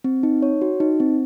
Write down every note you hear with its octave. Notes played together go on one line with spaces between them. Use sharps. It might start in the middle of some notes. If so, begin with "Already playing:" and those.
C4
D#4
C#5
F#4
D#4
C4